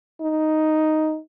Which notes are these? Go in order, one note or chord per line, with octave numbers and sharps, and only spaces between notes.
D#4